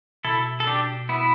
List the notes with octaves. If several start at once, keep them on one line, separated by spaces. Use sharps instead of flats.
B2 E4 A4
A4
D4 G4
B3 E4